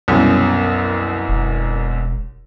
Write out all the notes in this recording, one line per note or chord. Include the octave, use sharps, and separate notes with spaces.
C2 F#2 B2
E1